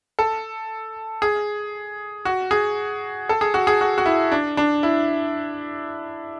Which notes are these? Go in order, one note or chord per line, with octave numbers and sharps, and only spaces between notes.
A4
G#4
F#4
G#4
A4
G#4
F#4
G#4
F#4
F#4
E4
D4
D4
E4